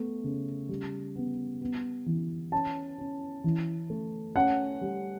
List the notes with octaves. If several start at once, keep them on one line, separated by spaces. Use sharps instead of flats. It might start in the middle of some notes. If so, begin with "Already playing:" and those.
Already playing: A3 B3
C#3
G3
B3
B3
E3
C#4 A5
C#4
E3
A3
C#4 F#5
G3